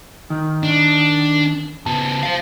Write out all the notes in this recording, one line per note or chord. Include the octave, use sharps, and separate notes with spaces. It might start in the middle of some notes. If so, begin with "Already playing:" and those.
D#3
D4
C#3 B3 A5
C5 F5